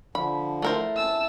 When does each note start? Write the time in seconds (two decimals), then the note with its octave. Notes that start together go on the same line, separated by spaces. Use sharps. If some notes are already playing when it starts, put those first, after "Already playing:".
0.15 D3 F3 B5
0.62 A3 E4 A#4 C5
0.97 C#4 A5 E6